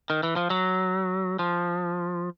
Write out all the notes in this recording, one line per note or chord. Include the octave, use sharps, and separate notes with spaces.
D#3
E3
F3
F#3
F3